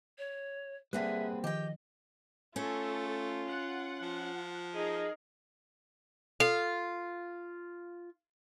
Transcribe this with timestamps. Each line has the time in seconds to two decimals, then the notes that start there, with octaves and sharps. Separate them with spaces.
0.18 C#5
0.93 D3 G3 A#3 C4 G#4 B4 E5 F#6
1.44 D#3 F3 G4 D#5 G5
2.56 A3 C#4 F4 A4
3.47 F#5
4.02 F3
4.75 D#4 G#4 A#4
6.40 F4 A4